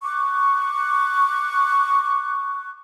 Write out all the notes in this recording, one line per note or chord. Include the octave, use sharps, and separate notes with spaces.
C#6 D6 F#6